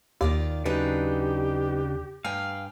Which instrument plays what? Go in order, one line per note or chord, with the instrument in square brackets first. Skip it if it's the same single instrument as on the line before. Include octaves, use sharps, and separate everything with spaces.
[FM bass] D#2 [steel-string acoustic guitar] D#3 F4 D5
[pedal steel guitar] C#3 D4 [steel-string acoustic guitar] F#3 D#4 B4 [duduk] G4
[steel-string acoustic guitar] G2 G5 G#5 [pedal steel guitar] F5